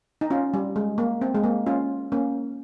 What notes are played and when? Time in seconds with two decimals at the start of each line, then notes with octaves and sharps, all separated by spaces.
0.21 D#4
0.31 C#4 F4
0.54 G3
0.76 G#3
0.98 A#3
1.21 C4
1.35 G#3
1.43 A#3
1.66 C#4 F4
2.12 A#3 C#4